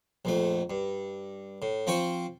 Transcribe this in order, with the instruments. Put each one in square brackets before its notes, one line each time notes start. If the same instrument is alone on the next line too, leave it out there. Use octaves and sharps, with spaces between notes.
[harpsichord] A#1 F2 A3
G2
A2
F3 C4 C5 C#6